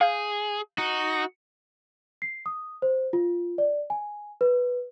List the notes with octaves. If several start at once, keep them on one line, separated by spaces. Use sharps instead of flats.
G#4 F5 G6
D#4 F#4
C7
D#6
C5
F4
D5
G#5
B4